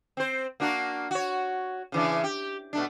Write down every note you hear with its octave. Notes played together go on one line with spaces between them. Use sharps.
C4 C5
A#3 D4 F#4
F#4 C#5
C#3 E3 D4
G4
B2 A3 D4